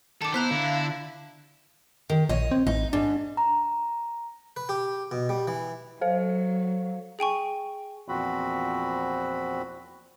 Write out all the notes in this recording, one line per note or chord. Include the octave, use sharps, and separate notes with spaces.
D#3 A4 A5 D6
B3 E4 C5 A#5 F#6 B6
D3 F5
D#3
A#1 C#5 D#5
C4
A1 D#4
G#2 D4
A#5
B4
G4
B2
G3
E3
F#3 A4 C5 F5
G#4 G5 G#5 C#6
E2 A#2 F3 C4 F#4 B5